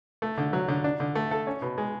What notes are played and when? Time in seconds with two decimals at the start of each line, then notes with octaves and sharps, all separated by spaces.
0.22 A3
0.38 D3
0.53 F#3
0.68 D3
0.84 D4
1.00 D3
1.15 A3
1.31 A4
1.47 C#4
1.62 B2
1.78 G#3